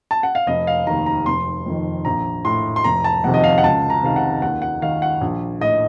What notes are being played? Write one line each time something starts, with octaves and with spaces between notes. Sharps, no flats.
A5
F#5
F5
F1 D#5
F5
D#2 D#3 A#5
A#5
F1 C6
F2 D#3
A#1 A#5
A2 C6
C6
F1 A#5
A5
F2 C3 D#3 F#5
D#5
F5
F#5
C#2 A5
A#5
C3 D#3 F5
F#5
D#2 F#5
F#5
D#3 F5
F#5
A#1
A2 D#5